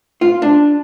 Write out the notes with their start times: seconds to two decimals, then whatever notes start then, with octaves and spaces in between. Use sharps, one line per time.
0.21 F4
0.42 D4